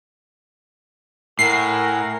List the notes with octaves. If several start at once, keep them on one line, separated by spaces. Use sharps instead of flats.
A2 A#4 E5 F#5 G#5 C7